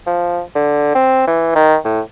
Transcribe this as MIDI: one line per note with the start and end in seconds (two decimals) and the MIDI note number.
0.06 0.40 53
0.55 0.94 50
0.95 1.26 60
1.27 1.55 52
1.56 1.76 51
1.85 2.00 45